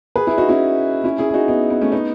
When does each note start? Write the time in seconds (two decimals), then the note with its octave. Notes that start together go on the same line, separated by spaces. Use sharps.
0.16 G#4 B4
0.27 E4 G#4
0.38 D#4 F#4
0.49 C#4 E4
1.04 C#4 E4
1.18 E4 G#4
1.29 G#4
1.34 D#4 F#4
1.48 B3 D#4
1.70 B3
1.81 A3 C#4
1.92 B3 D#4